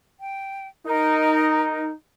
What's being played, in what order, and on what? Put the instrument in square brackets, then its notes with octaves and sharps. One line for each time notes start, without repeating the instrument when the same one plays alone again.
[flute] G5
[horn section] D#4 [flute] A#4